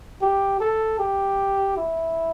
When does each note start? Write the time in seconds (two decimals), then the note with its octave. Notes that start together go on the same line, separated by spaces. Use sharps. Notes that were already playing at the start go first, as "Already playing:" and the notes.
0.21 G4
0.60 A4
0.99 G4
1.77 E4